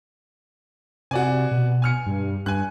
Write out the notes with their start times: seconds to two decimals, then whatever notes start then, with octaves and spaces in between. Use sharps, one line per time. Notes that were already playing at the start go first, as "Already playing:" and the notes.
1.11 C3 F#4 D5 G#5
1.51 B2
1.82 G#5 F6 C#7
2.06 G2
2.46 G2 G#5 F#6